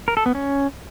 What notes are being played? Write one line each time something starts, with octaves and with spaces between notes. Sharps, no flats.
A#4
A4
B3
C#4